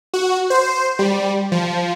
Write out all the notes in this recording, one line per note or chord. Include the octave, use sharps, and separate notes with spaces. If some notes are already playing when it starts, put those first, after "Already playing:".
F#4
C5
G3
F3